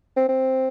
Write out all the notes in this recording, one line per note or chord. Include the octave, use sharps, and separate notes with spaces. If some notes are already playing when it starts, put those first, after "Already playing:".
C4
C4